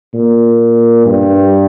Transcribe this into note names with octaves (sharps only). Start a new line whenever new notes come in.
A#2
G2